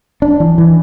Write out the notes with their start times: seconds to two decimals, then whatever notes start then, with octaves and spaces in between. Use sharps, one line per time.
0.22 D4
0.40 E3
0.58 E3